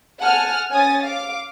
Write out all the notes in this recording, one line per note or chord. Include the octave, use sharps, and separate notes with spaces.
F#5 G#5 A5 F6
C#4 G#5 D#6 A6
F5 D6